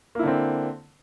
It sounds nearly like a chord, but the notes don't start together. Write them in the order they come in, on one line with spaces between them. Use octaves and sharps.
A#3 E4 D3 C4